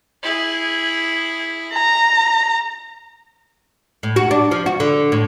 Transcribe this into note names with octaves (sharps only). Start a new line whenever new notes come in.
E4 G#4
A#5
A2
F#4
D4
F3
F#4
D3
A2